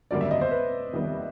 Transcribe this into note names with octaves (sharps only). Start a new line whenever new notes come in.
G#1 F#2 D3 G3 A#3 D5
E5
D#5
C5
B4
F1 D#2 D#3 G3 B3